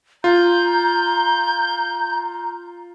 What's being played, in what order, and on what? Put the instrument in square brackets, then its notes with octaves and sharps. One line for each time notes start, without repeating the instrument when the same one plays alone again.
[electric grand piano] F4 [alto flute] A#5 [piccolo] G6